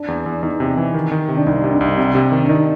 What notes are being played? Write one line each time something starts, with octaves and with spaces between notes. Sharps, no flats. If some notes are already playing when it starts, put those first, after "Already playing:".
Already playing: D4
E2
E2
E2 D#4
C3
E3
D#3
D#3
C3
D4
C2 D#4
C3
D4
C2
C3
C3
D#3
D4
D#3 D#4